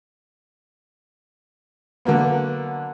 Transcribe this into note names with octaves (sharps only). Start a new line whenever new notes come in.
D3 F#3 A#3 B3